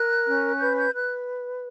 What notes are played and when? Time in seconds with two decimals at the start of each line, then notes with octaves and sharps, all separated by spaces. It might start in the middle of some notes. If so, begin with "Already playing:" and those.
Already playing: A#4 F#6
0.25 C#4
0.59 B4 G6
0.77 G6
0.93 B4 F#6